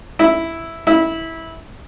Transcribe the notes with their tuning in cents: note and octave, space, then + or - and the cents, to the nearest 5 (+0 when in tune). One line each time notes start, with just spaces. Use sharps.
E4 +0
E4 -15